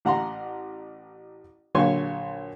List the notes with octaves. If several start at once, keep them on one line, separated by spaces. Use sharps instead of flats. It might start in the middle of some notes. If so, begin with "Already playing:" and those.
A1 F#5 A#5 C6
A#1 D3 F#3 C#5 G#5 C6